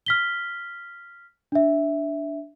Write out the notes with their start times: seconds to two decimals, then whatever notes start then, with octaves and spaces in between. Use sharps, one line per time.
0.06 F6 B6 G7
1.52 D4 E5